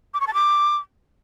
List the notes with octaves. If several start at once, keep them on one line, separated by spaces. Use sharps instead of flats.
D6
C#6
A5
D6